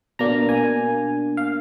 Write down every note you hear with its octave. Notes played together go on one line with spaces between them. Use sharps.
B2 A#3 D4 A#5
G#5
F5